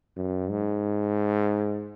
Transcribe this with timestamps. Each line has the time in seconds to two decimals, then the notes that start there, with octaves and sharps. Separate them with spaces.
0.17 F#2
0.50 G#2